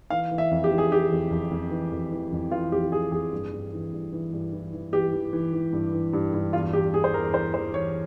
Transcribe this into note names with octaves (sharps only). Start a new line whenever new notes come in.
E3 F5
E3
E5
F2
G4
E3
G#4
E3 G4
F2
F2
F2
E3
F2
E3
F2
E3 F4
F2 G4
E3 G#4
F2 G#4
G2
G2
E3
G2
E3
G2
E3
E3
E3 G4
E3
E3
E3
G2
E3
G2
G2
E2 F4
E2 G4
E3 G#4
C5
E2 A#4
E3 C5
E2 C5
E3 C#5